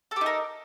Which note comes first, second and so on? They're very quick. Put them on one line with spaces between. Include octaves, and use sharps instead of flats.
A4 G4 D#4 A#4